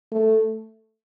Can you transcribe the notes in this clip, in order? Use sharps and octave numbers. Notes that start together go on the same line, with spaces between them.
A3